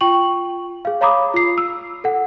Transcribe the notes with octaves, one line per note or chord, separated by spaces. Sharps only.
F4 G5 C#6 F#7
G#4 F5
C#5 F5 A#5 B5 D6 D#6
F4 C7
E6
A4 F#5